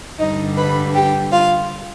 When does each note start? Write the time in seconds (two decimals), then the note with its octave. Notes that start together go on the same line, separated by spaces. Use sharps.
0.19 G2 D3 G3 D#4 D#5
0.57 B4 B5
0.94 G4 G5
1.32 F4 F5